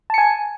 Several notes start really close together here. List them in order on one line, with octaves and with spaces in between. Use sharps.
A5 C#7 G#5